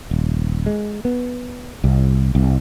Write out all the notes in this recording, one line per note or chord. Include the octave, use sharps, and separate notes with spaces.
D#1
G#3
B3
C2
C2